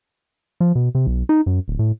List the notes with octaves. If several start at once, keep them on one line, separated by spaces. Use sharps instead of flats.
F3
B2
C3
B1
D#4
F#2
D1
A2